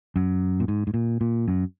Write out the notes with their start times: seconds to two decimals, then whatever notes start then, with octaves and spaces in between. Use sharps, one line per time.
0.16 F#2
0.60 A#2
0.68 G#2
0.87 G#2
0.94 A#2
1.21 A#2
1.48 F#2